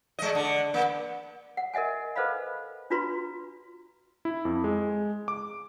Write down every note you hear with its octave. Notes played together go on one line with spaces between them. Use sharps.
G#3 D#5
D3
A#3
F#5
A#4 D#5 E5 F#5 G#5
A4 B4 C5 D#5 F5 B5
D4 F4 F#4 B4 A#5 C6
E4
F2
G#3
D6